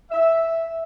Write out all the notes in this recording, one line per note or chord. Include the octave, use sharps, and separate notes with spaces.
E5